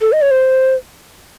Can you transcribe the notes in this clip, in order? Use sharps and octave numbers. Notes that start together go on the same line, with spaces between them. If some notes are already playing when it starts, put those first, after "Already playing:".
A4
D#5
C#5
C5